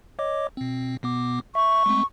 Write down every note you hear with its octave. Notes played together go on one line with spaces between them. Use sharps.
C#5 D#5 D6
B2 C4
B2 B3 D6
E5 C#6
G#3 A3 C4